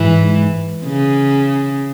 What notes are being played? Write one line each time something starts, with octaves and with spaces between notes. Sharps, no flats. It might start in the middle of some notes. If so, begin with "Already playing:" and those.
Already playing: G#2 E3
C#3